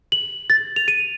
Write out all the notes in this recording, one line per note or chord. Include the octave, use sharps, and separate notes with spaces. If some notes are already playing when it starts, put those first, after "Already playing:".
F#7
A6
F7
D#7